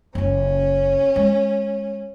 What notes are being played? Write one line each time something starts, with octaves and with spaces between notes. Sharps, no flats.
F#1 C#4 F4
G#3